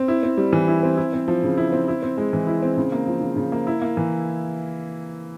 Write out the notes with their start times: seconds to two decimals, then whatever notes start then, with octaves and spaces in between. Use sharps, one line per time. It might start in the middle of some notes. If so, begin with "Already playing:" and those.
Already playing: C4
0.08 E4
0.23 C4
0.37 G3
0.53 E3
0.68 E4
0.83 C4
0.97 E4
1.13 C4
1.28 F3
1.43 C#3
1.58 E4
1.72 C4
1.88 E4
2.03 C4
2.18 G#3
2.33 E3
2.47 E4
2.63 C4
2.77 C#3
2.92 A#3
3.07 F3
3.22 C#3
3.36 C#3
3.52 A#3
3.67 E4
3.82 A#3
3.97 E3